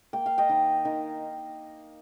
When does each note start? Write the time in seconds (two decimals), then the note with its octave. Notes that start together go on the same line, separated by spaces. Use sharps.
0.13 A#3 G5
0.26 F5
0.38 D#5 G5
0.49 D#3
0.85 D#3